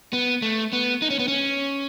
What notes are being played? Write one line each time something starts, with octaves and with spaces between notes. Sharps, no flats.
B3
A3
B3
D#4
C#4
B3
C#4